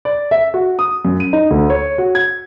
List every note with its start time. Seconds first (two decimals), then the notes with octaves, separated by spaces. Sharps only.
0.05 D5
0.31 E5
0.54 F#4
0.79 D#6
1.05 F#2
1.20 D#7
1.33 D#4
1.50 D2
1.70 C#5
1.98 F#4
2.15 G#6